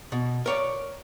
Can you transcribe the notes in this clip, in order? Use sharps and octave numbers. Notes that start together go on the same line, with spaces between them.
B2
A#4 C#5 D5